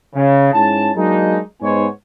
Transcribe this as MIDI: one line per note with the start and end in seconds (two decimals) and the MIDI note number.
0.15 0.53 49
0.54 0.91 44
0.54 0.91 61
0.54 0.91 64
0.54 0.91 81
0.96 1.41 54
0.96 1.41 56
0.96 1.41 58
0.96 1.41 62
0.96 1.41 63
1.62 1.87 44
1.62 1.87 59
1.62 1.87 63
1.62 1.87 72
1.62 1.87 73
1.62 1.87 80